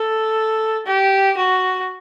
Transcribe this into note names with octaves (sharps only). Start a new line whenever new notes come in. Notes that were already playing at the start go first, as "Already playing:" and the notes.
Already playing: A4
G4
F#4